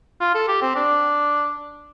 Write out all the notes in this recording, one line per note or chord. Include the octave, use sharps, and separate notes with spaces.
F4
A4
G4
C4
D4